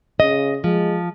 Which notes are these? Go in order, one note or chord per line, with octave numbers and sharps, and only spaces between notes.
C#3 D#5
F3 G#3